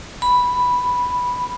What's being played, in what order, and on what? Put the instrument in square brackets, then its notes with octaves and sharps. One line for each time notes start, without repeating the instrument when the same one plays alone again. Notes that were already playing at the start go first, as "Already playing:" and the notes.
[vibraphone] B5